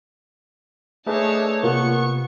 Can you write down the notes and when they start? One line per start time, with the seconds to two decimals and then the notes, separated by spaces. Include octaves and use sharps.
1.07 A3 D4 D#4 G#4 B4 C#5 E5 A5
1.63 C3 A#3 B3 F4 C#6